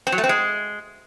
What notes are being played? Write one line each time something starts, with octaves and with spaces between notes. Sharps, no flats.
C4
F#3
A3
C4
G#3